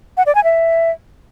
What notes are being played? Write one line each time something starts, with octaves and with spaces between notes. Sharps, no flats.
F#5
D5
G#5
E5